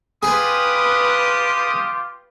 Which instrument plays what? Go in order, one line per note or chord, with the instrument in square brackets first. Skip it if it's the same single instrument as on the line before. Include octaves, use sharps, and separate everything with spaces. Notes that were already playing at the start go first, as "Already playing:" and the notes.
[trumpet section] F4 G4 [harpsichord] G#4 [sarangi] B4 [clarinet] D#6